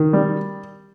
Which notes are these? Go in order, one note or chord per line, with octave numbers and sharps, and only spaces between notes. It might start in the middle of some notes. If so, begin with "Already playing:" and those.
Already playing: D#3
G3